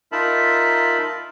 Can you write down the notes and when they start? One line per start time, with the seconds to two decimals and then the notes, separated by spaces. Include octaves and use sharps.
0.12 D#4 F4 A#4 E5 A5 B5